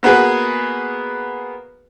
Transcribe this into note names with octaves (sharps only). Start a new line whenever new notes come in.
A#3 B3 F#4 G#4 B4